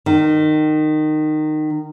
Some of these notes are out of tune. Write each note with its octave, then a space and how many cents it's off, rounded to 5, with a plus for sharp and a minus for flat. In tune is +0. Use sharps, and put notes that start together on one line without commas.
D#3 -20